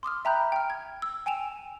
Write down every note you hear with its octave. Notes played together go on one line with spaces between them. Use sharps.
C6 D6 D#6 F6
E5 G5 A#5 B5 F#6 G6
G5 F6
G#6
E6
G5 G#5 D7 E7 F7